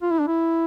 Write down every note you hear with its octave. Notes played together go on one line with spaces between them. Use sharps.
F4
E4
D4
E4